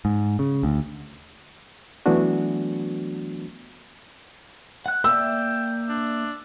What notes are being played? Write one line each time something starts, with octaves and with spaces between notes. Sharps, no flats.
G#2
C#3
D2
E3 F#3 A3 B3 D4 F#4
F#5 F#6
A#3 D5 E5 G5 E6
D4